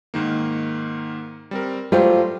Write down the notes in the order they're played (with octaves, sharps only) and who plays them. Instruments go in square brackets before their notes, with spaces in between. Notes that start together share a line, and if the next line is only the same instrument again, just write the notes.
[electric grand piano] G#2 D#3 A#3
G3 C4 A#4
[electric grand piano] F#3 A3 G5 [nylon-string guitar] G3 F4 C5